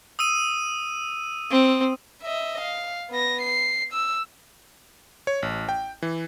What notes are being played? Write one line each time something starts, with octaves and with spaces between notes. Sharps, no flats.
D#6 E6 D#7
C4
D#5 E5
F5
B3 A#6
C7
E6
C#5
A1
G5
E3